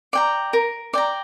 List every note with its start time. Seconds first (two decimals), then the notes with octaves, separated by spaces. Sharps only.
0.13 D5 G5 A#5
0.53 A#4
0.93 D5 G5 A#5